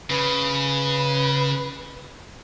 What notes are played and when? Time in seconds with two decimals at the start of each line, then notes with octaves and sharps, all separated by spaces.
0.10 C#3 B4